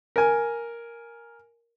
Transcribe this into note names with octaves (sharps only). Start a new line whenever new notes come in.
A#4 G#5